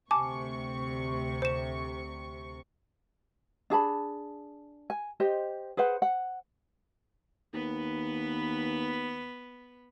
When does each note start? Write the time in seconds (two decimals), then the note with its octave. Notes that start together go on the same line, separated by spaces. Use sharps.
0.11 D2 C3 G#5 A5 C#6 D6
1.42 C5 E7
3.70 D4 G#4 A5 B5
4.90 G#5
5.20 G4 C5 D#5
5.77 G#4 B4 C5 F#5
6.02 F#5
7.54 D#2 B3 B4